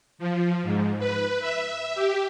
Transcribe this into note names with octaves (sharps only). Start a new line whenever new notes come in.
F3
G#2
B4
E5
G4